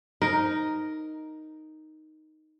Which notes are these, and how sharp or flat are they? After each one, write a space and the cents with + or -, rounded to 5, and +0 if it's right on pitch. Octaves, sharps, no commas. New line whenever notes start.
D#4 +0 A#4 +5